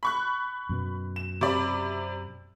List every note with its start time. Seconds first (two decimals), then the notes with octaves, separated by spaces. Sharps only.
0.03 B5 C#6 F#6
0.69 F#2 B2
1.16 E7
1.41 C3 D5 B5